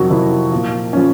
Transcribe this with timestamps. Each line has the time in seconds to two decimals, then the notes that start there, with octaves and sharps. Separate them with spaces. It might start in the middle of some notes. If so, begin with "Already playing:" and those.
Already playing: F2 C3 D#3 F#3 F#4
0.10 F2 C3 D#3 F#3 E4
0.52 A#2 F3
0.93 A#2 F3 C#4